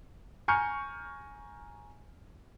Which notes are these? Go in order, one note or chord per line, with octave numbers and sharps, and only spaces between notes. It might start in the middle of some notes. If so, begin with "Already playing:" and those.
G#5 A#5 C#6 F6 G6 C#7